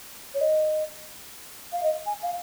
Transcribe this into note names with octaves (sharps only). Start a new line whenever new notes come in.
C#5
D#5
F5
D#5
G#5
F5